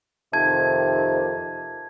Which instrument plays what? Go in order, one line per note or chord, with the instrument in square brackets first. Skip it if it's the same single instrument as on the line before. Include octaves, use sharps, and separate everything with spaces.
[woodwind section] F2 C3 D#3 [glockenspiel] A5 G#6